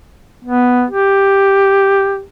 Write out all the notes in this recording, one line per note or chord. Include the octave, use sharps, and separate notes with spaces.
B3
G4